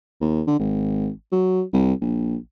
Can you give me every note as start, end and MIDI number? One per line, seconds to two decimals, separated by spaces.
0.21 0.42 39
0.47 0.59 50
0.59 1.08 32
1.32 1.62 54
1.73 1.93 36
2.01 2.36 34